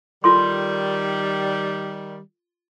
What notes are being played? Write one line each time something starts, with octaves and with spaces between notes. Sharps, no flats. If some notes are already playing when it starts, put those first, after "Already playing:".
D#3 G3 F4 A4 C6